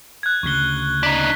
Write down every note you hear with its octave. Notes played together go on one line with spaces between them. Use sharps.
F#6 G#6
D2 C#3 C#6 G7
D4 D#4 B6